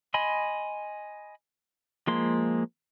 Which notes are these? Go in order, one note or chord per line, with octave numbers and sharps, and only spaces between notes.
D#5 G#5 B5 C6
F3 G#3 A#3 C6